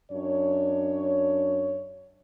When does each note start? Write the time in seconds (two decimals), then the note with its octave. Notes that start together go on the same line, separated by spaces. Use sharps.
0.11 F#2 D4 C#5